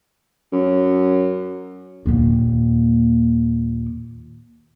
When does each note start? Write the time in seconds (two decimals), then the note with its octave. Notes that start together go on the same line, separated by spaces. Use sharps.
0.53 F#2
2.06 D#2 A#2